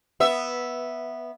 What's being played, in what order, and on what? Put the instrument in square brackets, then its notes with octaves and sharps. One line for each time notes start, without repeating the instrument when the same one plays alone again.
[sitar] B3 E5